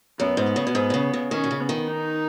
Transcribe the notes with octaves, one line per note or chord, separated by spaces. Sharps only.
F#2 B3
G#2
C#3
B2
G#2
B2
C#3
C#3
D#3 C#4
B2
C#3
B3
D#3
D#4